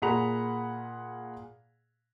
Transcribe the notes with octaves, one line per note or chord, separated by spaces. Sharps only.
A#2 G#4 F#5 A#5 B5 F7